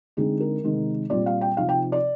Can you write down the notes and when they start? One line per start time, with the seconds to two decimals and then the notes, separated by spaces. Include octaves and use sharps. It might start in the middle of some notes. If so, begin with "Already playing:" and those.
0.17 D3 G#3 C4 D#4 G#4
0.40 A#4
0.63 C3 D#3 G#3 D#4
1.10 A#2 G3 C4 D5
1.26 F5
1.41 G5
1.57 C3 F3 C4 D#4 F5
1.69 G5
1.92 D5